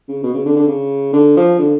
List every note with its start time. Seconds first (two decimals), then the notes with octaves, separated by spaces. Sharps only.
0.08 C#3
0.23 B2
0.34 C#3
0.46 D3
0.56 D3
0.68 C#3
1.13 D3
1.37 F3
1.58 D3